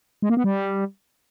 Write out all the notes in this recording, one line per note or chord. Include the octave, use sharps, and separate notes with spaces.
G#3
A#3
B3
G3